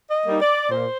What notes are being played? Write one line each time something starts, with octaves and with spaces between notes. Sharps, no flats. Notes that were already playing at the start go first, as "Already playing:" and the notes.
D#5
G3 A#3 D#4
D5
A#2 C5